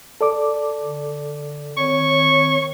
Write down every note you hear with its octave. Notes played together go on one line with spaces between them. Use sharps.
A4 D5 D6
D3
D#3 C4 C#5 C#6